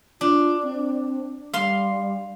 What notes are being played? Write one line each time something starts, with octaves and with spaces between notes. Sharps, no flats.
D4 F4
C4
G3 F5 C6